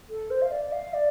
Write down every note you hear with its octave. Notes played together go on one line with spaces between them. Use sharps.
A4
C5
F5
D5
F5
D5